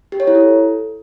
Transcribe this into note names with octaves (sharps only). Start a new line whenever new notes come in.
G4
C#5
E4
A4